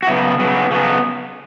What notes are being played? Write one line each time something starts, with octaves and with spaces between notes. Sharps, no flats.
F#4
C#3 F#3 B3 E4
C#3 F#3 B3
C#3 F#3 B3 C#4